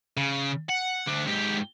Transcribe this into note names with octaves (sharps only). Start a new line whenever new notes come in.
C#3
F#5
D2 D4
G#2 G4